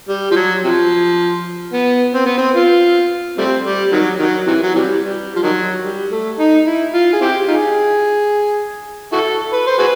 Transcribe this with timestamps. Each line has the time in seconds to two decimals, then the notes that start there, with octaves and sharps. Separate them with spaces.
0.09 G3
0.31 F3
0.36 F#3
0.64 C3 F3
1.73 B3
2.15 C4
2.26 B3
2.38 C4
2.56 F4
3.38 G3 A3 C4
3.64 G3
3.92 D#3 F#3
4.19 D#3 F#3
4.47 C3 E3
4.63 F#3
4.75 C3 E3 G3
5.02 G3
5.36 F3
5.43 D#3 F#3
5.84 G3
6.11 A3
6.39 D#4
6.66 E4
6.93 F4
7.13 G#4
7.21 C4 E4 G4
7.48 D#4 F4 G#4
9.12 E4 F#4 A4
9.53 B4
9.67 C5
9.79 F#4 G#4 B4